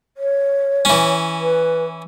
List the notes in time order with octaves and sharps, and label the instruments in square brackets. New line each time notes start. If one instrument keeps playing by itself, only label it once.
[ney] C#5
[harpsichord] E3 C#4
[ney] B4